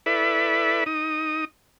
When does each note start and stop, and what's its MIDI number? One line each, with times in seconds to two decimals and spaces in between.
0.06 0.84 64
0.06 0.84 69
0.06 0.84 71
0.06 0.84 74
0.06 0.84 76
0.06 0.84 83
0.86 1.45 63
0.86 1.45 87